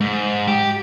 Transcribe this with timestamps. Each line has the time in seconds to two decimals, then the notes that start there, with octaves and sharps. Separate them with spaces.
0.01 G#2
0.48 G4